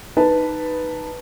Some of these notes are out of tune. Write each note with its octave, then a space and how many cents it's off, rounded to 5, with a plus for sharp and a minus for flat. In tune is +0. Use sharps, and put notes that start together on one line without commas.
D#4 +0 B4 +0 A5 +0